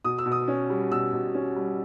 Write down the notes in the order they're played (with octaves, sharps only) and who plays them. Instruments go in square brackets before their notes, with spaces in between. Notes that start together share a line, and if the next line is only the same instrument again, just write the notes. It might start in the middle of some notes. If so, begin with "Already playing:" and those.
[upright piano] B2 D#6
E6
B2
D#6
C#4
G3
B2 E6
B2
C#4
G3